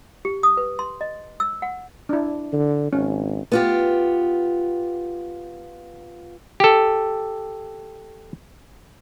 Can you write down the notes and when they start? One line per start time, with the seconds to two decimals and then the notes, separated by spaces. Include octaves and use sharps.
0.25 G4
0.43 D#6
0.57 B4
0.79 C6
1.01 D#5
1.40 E6
1.62 F#5
2.09 D4 E4
2.53 D3
2.93 G#1 C#4
3.52 B3 F4 G4
6.60 G4 A4